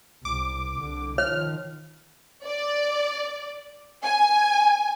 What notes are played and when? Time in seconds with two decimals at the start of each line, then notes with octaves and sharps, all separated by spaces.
0.25 C2 D6
0.73 C2 D3
1.18 D#3 F3 C#5 F6
2.46 D5
4.04 G#5